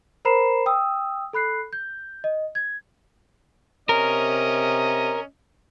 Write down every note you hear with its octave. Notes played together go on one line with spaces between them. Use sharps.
A#4 C5 A#5 B5 C7 E7
G5 D#6 E6
A4 B5 F#6 C7
G6
D#5
G#6
C3 C#4 A#4 D#5